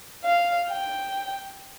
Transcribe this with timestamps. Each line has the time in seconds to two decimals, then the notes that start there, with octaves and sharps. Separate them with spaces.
0.24 F5
0.69 G5